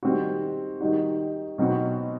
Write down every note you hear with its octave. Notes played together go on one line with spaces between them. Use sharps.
D#3 G3 C4 F#4
D#3 G3 D#4 F#4
B2 F#3 C4 D#4 F#4